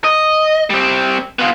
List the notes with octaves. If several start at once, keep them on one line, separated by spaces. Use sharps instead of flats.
D#5
G3 C4
B3 F4